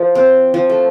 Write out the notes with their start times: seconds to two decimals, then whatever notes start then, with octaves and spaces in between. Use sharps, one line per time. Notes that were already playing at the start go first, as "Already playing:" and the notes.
Already playing: F3
0.15 C4
0.54 F3
0.70 A3